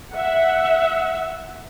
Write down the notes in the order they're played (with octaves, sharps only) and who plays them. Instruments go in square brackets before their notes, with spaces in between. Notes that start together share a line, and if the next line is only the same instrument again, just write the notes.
[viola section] E5 F#5